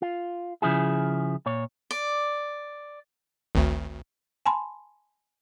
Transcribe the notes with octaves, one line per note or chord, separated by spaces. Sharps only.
F4
C#3 F3 E4 G#4
A#2 C#5
D5
G#1 D2
G#5 A5 B5 C6